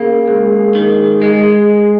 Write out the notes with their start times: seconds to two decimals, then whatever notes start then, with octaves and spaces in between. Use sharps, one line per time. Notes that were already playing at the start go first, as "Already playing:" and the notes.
Already playing: C#3 A#3 G#4
0.28 C#2
0.75 D#3
1.22 G#3